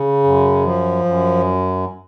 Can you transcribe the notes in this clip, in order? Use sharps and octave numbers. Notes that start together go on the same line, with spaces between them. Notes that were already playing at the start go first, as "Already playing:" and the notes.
Already playing: C#3
F#2
F3
F#2